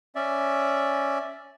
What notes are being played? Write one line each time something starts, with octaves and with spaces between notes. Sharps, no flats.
C#4 D5 E5